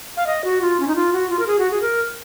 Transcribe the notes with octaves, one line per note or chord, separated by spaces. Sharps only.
F5
D#5
F#4
F4
C#4
D#4
F4
F#4
F4
A#4
G#4
F#4
G#4
A#4